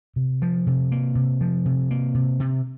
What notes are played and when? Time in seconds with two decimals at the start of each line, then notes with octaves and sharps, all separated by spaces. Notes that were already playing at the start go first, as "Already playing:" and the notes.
0.16 C3
0.42 F3
0.67 C3
0.92 A#3
1.15 C3
1.41 F3
1.65 C3
1.91 A#3
2.15 C3
2.40 C3